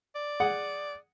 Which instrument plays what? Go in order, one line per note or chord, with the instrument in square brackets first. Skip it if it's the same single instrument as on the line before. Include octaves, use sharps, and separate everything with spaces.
[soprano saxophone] D5
[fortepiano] G#4 F#5